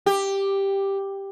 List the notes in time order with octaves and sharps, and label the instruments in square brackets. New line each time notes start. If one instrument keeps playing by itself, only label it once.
[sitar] G4